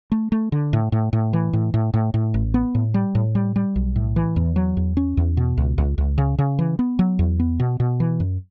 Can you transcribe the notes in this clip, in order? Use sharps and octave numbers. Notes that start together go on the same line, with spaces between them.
A3
A3
D3
A2
A2
A2
E3
A2
A2
A2
A2
A1
B3
A2
G3
A2
G3
G3
B1
A2
E3
E2
F#3
E2
C#4
E2
B2
C#2
C#2
C#2
C#3
C#3
E3
B3
F#3
E2
B3
B2
B2
E3
F#2